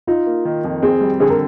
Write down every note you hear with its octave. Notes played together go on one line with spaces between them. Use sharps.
D#4 F4
A#3
D#3
F2
C4 G#4
G3
D3 G#4
A#4